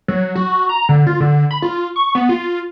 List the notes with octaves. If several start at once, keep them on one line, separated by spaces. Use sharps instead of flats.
F#3
F#4
A#5
D3
F4
D3
B5
F4
C#6
B3
F4